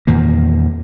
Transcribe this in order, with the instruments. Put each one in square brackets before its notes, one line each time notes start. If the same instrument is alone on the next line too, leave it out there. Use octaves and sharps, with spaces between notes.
[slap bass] E2 A#2 D#3 A#3